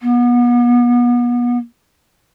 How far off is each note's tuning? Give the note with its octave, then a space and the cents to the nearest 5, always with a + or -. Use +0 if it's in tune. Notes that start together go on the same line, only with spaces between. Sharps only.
B3 -35